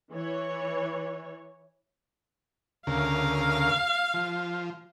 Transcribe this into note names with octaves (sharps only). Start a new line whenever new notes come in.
E3 C#5
D2 C#3 A#4 F5
F3